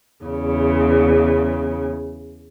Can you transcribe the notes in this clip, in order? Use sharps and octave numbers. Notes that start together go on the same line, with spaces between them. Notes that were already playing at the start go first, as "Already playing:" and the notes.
E2 C#3